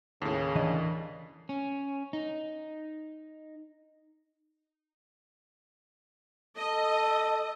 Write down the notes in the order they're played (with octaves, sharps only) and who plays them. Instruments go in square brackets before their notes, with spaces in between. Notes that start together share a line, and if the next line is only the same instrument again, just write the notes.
[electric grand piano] D#2 A2 [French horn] C#3
[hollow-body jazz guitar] E3 D4 D#5
[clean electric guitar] C#4
D#4
[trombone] A4 [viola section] D#5